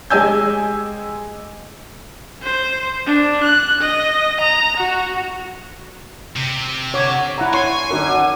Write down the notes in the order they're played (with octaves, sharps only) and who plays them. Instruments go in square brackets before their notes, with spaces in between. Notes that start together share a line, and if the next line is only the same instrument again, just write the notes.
[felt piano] G#3 G4 D#5 G#5 E6 G6
[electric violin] C5
D4
F#6
D#5
A#5
F#4
[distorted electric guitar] C3
[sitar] D3 [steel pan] C#5 D6
[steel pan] E4 F#5 A#5
[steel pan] C#5 C6 C#6 [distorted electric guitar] G#5
[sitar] F#2 D3 [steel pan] D#4 F#4 A#4